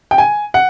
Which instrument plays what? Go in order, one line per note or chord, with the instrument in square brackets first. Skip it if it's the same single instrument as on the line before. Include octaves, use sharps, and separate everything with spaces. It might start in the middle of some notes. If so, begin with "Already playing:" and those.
[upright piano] G5
G#5
F#5